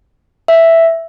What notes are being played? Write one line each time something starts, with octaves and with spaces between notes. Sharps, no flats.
E5